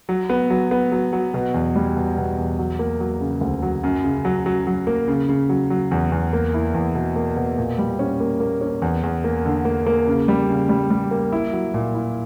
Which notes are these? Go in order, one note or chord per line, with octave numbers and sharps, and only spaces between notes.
F#3
B3
F#3
B3
F#3
F#3
B2
E2
G3
B2
B2
E2
F#3
A#3
F#3
C#3
D2
F#3
F#2
C#3
F#3
F#3
F#3
A#3
C#3
C#3
F#3
F#3
E2
E2
A#3
E4
E2
B2
A#3
B2
A#2
G3
C#4
A#3
A#3
C#4
E2
E2
A#3
D3
A#3
A#3
C#3
G3
C#3
G3
G3
A#3
E4
F#3
A#2
E4